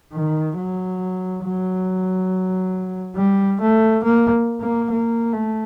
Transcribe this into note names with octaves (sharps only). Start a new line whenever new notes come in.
D#3
F#3
F#3
G3
A3
A#3
A#3
A#3
A3